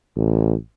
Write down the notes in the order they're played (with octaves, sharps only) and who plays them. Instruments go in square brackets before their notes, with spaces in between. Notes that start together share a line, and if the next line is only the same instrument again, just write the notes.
[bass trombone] A1